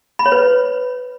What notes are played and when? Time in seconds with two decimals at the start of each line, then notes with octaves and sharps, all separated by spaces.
0.19 B5
0.26 C#5
0.32 B4